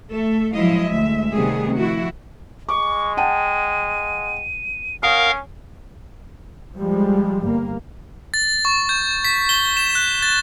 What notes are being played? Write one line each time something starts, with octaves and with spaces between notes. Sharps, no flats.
A3 A4 E5
F3 F#3 G#3 E4 D#5 F5
D2 G#3 E5
C3 D#3 G3 A3 B3 G#4
F3 E4 F#4
G#3 C#6 D6
F#5 G5 A5 D#7
C#4 A#4 F5 F#5 D#6
F3 G3 G#3
G1 A#3
A6
C#6
G6
B6
G7
E7
F#6
A6